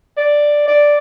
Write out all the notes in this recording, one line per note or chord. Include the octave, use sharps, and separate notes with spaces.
D5
D5